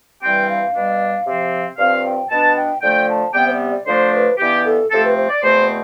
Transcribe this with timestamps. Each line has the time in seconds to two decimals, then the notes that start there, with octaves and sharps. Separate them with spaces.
0.23 G2 E3 G3 C4 G5
0.49 F5
0.74 B2 G3 D4
1.26 C3 F3 C4
1.78 G2 F3 C4 F5
2.04 G5
2.31 B2 B3 D4 A5
2.56 G5
2.82 D3 F3 A3 G5
3.08 A5
3.34 C3 G3 B3 G5
3.47 C5
3.52 D5
3.69 D5
3.87 D3 F3 A3 D4 C5
4.13 B4
4.39 G2 E3 B3 G4
4.65 A4
4.91 C3 F3 A3 C4 A4
5.04 B4
5.16 C5
5.29 D5
5.43 E2 B2 A3 C4 C5